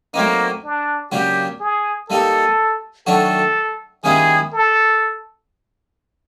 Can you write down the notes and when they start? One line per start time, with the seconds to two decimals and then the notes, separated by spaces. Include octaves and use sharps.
0.14 F#3 A3 A#3 C4 D#4
0.64 D4
1.12 C#3 F#3 A#3 D4 G4
1.60 G#4
2.09 G3 A#3 D#4 G4 A4
3.07 D#3 F#3 A3 D4 F#4 A4
4.04 D#3 G3 A#3 C#4 E4 G#4
4.53 A4